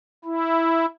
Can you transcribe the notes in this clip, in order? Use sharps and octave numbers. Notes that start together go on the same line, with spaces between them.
E4